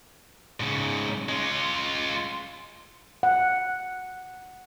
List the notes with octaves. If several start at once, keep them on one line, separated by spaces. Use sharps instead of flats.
G#2 C#3
G#3 F4
F#5